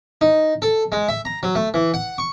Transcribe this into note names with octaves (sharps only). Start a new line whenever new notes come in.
D#4
A4
G#3
E5
A#5
F#3
A3
E3
F#5
C#6